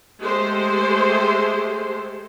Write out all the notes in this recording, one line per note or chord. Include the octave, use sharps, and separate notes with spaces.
G#3 A3 G4 A4 C5